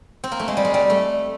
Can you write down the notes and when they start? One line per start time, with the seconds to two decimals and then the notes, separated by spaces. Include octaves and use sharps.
0.24 C4
0.32 A#3
0.40 A3
0.48 G#3
0.57 G3
0.65 G#3
0.74 G3
0.90 A3